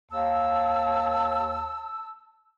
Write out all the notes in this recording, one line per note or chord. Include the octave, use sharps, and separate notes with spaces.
D#2 A5 E6